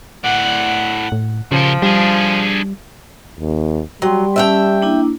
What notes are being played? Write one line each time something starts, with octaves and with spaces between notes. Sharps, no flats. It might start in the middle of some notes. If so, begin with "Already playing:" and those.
A2 D5 F#5
A2
A#2 C#3 F3 G4
G3 D4 G#4
D#2
F#3 G3 G5 C6
C#4 E5 F#5 G5 A5 E6
A#3 D4 E4